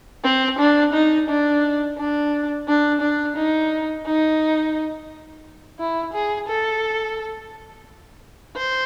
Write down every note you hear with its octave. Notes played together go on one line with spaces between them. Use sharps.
C4
D4
D#4
D4
D4
D4
D4
D#4
D#4
E4
G#4
A4
C5